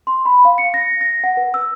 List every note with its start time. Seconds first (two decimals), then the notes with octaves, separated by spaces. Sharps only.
0.07 C6
0.25 B5
0.45 F5
0.58 C#7
0.74 A#6
1.01 A#6
1.24 F#5
1.37 B4
1.54 E6